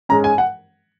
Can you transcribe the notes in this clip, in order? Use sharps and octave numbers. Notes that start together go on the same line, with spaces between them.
G#2 G#3 C#4 A#5
G#5
F#5